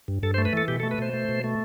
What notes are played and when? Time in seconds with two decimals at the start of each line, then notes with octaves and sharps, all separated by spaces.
0.08 G2
0.23 G2 A4
0.34 C5
0.38 A3
0.45 B4
0.53 E3 A4
0.68 B2 G4
0.80 A4
0.83 A3
0.91 B4
0.98 B2 C5
1.14 A3
1.29 B2
1.44 A3